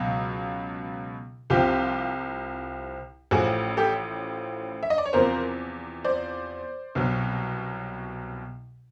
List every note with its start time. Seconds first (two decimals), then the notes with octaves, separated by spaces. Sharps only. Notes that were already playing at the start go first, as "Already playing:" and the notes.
Already playing: C#2 B2 F#3
1.50 C2 C3 F3 F4 G4
3.31 A1 A2 F3 F#4 G#4
3.77 G4 A4
4.83 E5
4.90 D#5
4.98 D5
5.06 C#5
5.13 E2 C3 F3 A#4 C5
6.04 C5 D5
6.95 C2 B2 F#3